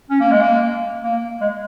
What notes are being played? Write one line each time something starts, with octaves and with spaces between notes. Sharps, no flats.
C#4
A#3
G#3
A#3
A#3
G#3